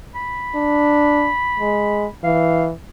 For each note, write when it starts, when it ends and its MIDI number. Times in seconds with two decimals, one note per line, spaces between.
0.15 2.12 83
0.55 1.31 62
1.59 2.06 56
2.24 2.72 52
2.24 2.65 77